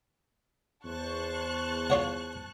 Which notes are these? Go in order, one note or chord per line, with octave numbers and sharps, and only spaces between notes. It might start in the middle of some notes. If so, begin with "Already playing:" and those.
E2 C5 A5 C#6 F#6
F4 C#5 F#5